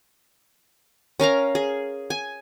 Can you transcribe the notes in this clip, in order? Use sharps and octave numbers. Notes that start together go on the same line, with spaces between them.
C#4 A#4 F5 A#5
G#4
G#5